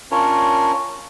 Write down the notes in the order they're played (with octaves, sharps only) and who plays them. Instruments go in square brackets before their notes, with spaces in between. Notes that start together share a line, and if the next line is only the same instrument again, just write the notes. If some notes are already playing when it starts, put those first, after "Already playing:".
[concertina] C#4 D4 F4 A#4 C#5